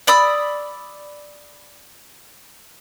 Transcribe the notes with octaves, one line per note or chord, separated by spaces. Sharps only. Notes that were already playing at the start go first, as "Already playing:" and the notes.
D5 B5 D#6 E6